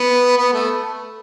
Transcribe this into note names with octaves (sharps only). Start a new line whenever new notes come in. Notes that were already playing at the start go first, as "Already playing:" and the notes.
Already playing: B3
B3
A3